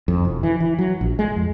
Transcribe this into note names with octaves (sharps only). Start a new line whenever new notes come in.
F2
E1
E3
E3
F#3
A#1
G#3
F2